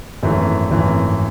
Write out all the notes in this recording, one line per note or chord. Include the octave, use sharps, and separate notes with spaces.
G#1 F#2 E3 A3
G#1 F#2 E3 A3